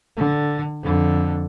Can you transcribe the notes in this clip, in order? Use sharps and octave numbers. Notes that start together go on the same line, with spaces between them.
D3
F2 D3